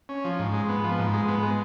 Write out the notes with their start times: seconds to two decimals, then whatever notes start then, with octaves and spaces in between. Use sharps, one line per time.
0.09 C#4
0.25 F3
0.39 G#2
0.53 G#3
0.69 B3
0.84 F3
0.99 G#2
1.13 G#3
1.28 B3
1.43 G#3